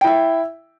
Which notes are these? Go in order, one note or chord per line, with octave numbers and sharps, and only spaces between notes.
E4 E5 G5